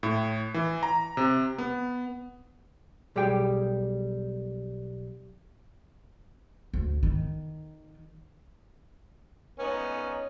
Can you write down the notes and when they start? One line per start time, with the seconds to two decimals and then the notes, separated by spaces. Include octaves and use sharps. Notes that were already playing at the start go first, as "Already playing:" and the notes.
0.03 A2
0.54 E3
0.83 A#5
1.17 C3
1.58 B3
3.16 B1 G3 G4 G#4 G5
6.74 D2
7.03 D#3
9.59 B3 C#4 D#4